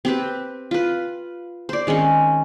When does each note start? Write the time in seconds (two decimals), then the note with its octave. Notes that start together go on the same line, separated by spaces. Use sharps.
0.05 C4 G4 B4
0.71 F4 B4
1.69 C5 D5
1.87 D#3 G#3 C4 C#4